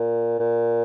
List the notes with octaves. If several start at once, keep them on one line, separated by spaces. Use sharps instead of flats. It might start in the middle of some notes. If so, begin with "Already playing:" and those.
Already playing: A#2
A#2